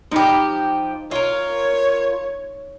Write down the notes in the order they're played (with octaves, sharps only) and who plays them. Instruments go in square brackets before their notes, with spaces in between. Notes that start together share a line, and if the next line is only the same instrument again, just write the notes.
[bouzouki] F3 G4 [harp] D#4 B5
[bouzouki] F4 A#4 [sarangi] C#5